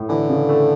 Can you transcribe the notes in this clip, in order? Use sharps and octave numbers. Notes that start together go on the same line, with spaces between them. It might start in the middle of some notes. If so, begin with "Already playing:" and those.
Already playing: A2
D3 E3
C#3
A3